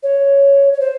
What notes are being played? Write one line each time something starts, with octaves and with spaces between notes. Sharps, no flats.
C#5
C#5
C5